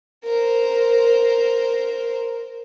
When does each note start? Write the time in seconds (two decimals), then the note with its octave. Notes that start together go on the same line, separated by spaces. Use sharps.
0.25 A#4 C5